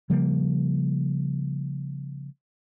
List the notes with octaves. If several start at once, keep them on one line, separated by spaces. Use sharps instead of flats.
C#3 F3 G3 A#3